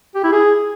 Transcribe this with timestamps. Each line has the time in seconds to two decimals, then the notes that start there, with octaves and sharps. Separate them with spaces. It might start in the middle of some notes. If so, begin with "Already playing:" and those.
0.15 G4
0.24 E4
0.33 G#4